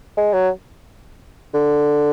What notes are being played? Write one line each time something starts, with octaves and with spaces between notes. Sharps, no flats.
G#3
F#3
D3